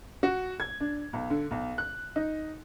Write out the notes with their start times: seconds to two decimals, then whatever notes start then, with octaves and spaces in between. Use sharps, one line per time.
0.23 F#4
0.60 G#6
0.80 D4
1.13 B1
1.30 D3
1.51 B1
1.78 F#6
2.16 D#4